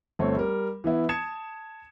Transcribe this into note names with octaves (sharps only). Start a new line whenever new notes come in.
G1 A3 C4 C#5
G3 A#4
E3 B3 E4
A5 D#6 G#6 C#7 E7